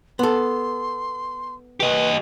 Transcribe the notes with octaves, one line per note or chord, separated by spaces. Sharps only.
B3 A4 C6
G4 B4 D#5